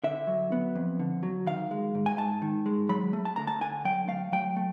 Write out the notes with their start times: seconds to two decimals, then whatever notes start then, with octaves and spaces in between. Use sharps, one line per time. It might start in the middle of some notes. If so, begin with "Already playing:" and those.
0.04 D3 E5
0.27 F#3
0.52 B3
0.75 F2
0.99 D3
1.23 F#3
1.47 D#3 F5
1.71 G#3
1.95 G#2
2.06 G#5
2.18 G#2 A5
2.42 D#3
2.66 G#3
2.89 F#3 B5
3.13 A3
3.25 A5
3.36 D3 A#5
3.47 A5
3.61 D3 G#5
3.85 F#3 G5
4.08 A3 F5
4.32 F#3 G5
4.56 A3